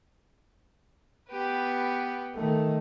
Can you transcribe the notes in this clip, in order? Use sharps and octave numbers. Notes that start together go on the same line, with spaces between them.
B3 G4 B4
D#3 A3